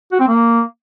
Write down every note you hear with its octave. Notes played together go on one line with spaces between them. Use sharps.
F#4
C4
A#3